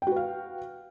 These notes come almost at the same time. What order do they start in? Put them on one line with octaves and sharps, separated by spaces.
G5 F#4 B4 F5